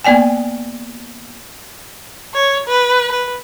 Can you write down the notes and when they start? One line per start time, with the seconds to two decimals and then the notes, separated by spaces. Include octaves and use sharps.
0.05 A#3 B3 D5 G5 G#5
2.34 C#5
2.68 B4
3.12 B4